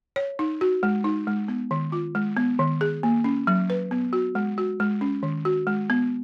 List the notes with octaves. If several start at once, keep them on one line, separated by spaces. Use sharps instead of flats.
C#5
D#4
F#4
G#3
D#4
G#3
B3
D#3
F4
G#3
B3
D#3
G#4
A#3
C#4
F#3
B4
B3
F#4
G#3
F#4
G#3
C#4
D#3
F#4
G#3
B3